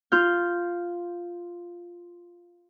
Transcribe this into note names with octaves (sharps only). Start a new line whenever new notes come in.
F4 F6 G6